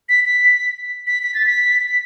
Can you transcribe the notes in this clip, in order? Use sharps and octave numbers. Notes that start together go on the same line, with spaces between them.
B6
B6
B6
B6
A6
B6
B6